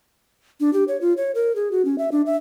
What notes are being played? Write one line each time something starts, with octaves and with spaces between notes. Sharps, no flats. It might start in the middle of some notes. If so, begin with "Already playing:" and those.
D4
G4
C#5
F4
C#5
A#4
G#4
F#4
C#4
E5
D4
E5